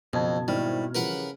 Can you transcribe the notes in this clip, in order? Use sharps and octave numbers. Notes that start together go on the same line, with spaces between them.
F#1 F2 B2 A5 G#6
G#1 G3 D#4 E4 F6
C#3 E3 F3 G3 A#4 B4 F#5